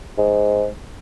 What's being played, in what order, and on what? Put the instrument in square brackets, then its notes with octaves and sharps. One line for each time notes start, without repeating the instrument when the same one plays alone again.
[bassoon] G#2